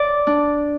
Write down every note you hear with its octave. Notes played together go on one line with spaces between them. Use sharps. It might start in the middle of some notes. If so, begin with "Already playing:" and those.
Already playing: D5
D4